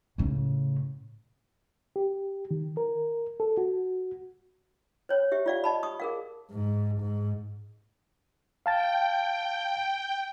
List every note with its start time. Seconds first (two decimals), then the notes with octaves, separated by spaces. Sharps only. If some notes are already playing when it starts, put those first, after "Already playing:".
0.18 A2 C#3
1.96 G4
2.51 D#3
2.77 A#4
3.40 A4
3.57 F#4
5.09 C5 C#5
5.32 G4 E5
5.46 F4 D5 F5
5.64 D#5 A5 B5
5.83 C#6 D#6
6.00 G#4 A#4 F5
6.51 G#2
7.01 G#2
8.66 F5 G5 A5 A6